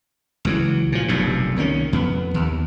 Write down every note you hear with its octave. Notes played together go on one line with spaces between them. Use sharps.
C#2 E3 F#3
A#2 F3
F1 B1 G2 A#2
C2 D#3 A#3 C#4
F2 B3
D#2